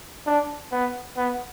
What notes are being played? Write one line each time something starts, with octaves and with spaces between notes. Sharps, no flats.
D4
B3
B3